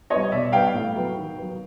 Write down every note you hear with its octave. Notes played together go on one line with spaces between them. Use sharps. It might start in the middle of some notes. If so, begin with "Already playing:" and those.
G3 B3 C#5 D#5
B2 D5 E5
G3 B3 F5 G5
A2
F#3 B3
D#3
F#3 B3